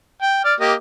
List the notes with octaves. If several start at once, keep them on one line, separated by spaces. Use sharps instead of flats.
G5
D5 F6
A#3 G4 D#5